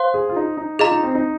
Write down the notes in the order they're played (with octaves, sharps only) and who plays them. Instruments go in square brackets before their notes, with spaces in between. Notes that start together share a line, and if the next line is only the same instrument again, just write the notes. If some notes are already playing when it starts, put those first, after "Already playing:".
Already playing: [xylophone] C5 F5 C6
[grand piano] G#4
F4
D#4
D#4
[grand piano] F4 [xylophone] G#4 D#5 A#5
[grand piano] D#4
C4
D#4